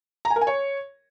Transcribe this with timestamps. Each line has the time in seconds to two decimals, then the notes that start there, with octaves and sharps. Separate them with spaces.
0.25 A#5
0.30 G#5
0.36 A#4
0.41 G#5
0.47 C#5